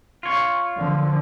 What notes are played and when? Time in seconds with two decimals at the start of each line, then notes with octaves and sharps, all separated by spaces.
0.23 F4 C#5
0.77 D3 F3